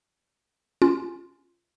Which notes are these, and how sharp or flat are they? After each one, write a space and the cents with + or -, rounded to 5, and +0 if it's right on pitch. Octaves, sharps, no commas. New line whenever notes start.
C#4 +0 F4 -10